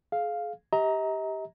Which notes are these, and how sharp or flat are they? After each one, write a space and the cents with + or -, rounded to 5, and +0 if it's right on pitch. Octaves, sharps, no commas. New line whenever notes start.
G#4 +35 F5 +0
G4 +0 D#5 +45 A#5 +0